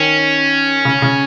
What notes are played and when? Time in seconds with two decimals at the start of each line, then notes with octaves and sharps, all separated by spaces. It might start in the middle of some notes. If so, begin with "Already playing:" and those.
Already playing: D#3 C#4
0.85 C#3
1.02 C#3